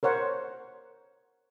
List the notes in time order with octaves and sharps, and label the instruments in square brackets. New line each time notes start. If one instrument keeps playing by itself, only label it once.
[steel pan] A#4 C5 C#5 F#5